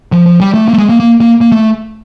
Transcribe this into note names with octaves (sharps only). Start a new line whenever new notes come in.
F3
F3
G3
A3
A#3
A3
G#3
A#3
A#3
A#3
A#3
A3